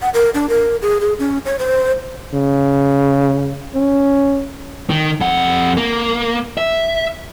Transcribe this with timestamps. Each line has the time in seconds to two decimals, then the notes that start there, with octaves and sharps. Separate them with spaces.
0.02 F#5
0.14 A#4
0.34 D4
0.49 A#4
0.82 G#4
1.01 G#4
1.19 C#4
1.46 C#5
1.59 C5
2.34 C#3
3.75 C#4
4.89 D#3
5.20 F2 F#5
5.77 A#3
6.58 E5